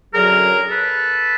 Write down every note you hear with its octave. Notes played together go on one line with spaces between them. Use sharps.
F#2 D3 F#3 G#4 A#4
A4 B4